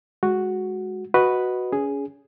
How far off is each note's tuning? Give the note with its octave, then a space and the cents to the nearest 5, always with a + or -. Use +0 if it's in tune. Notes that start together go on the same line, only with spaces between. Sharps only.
G#3 +0 F#4 +0
F#4 +0 B4 +0 D#5 +0
C#4 +30 G#4 +0